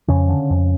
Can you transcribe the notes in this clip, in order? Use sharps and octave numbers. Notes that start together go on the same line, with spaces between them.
F2 C#3 C#4
D3
F2